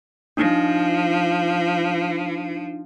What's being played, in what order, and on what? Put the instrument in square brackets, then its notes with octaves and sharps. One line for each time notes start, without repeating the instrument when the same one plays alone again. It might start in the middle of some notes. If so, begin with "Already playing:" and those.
[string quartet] F3 [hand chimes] D4 D#4 A#6